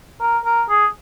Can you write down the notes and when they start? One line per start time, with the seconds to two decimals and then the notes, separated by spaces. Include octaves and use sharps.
0.21 A#4
0.45 A#4
0.69 G#4